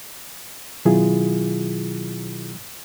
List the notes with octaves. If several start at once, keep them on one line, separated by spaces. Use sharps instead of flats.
B2 D#3 F#3 E4 F4 G#4